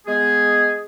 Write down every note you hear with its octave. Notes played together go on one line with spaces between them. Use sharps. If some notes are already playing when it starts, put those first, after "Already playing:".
G#3 B3 G#4